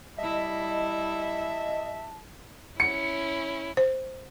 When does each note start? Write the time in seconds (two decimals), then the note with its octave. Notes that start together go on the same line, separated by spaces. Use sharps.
0.18 G3 E4 D#5 E5 A5
2.80 C#4 E4 C#7
3.77 C5